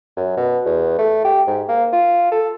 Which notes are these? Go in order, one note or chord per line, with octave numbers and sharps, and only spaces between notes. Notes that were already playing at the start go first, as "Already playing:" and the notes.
F#2
B2
E2
A3
G4
G#2
A#3
F4
A4